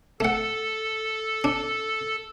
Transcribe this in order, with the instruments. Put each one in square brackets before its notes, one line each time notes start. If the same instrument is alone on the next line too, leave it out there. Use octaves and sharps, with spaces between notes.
[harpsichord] A3 F#5 [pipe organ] A4
[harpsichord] D4